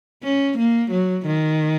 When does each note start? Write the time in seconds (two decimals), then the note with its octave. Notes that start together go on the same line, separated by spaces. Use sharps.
0.23 C#4
0.58 A#3
0.91 F#3
1.26 D#3